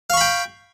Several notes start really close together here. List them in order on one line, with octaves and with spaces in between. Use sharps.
F5 C#6 B5 G5